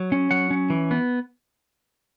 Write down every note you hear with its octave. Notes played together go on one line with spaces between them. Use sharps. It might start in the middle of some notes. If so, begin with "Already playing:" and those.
Already playing: F#3
C#4
F#3 F#5
C#4
E3
B3